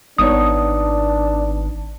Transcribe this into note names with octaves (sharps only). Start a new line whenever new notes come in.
G#1 B3 D4 D#4 C#5 D#6